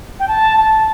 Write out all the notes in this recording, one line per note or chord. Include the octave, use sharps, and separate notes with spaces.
G5
A5
A5